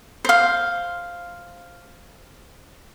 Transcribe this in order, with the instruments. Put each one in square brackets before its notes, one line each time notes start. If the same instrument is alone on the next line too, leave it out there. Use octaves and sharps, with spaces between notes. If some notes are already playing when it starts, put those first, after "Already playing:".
[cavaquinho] C5 F5